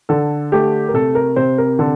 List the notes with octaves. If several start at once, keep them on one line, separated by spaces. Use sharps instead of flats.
D3 A4
A3 G4
A#4
C3 A4
A#4
C3 C5
A#4
D3 A4